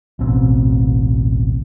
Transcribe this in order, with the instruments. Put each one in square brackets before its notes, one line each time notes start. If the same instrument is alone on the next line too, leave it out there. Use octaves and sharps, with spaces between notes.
[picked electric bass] A1 D2 B2 C4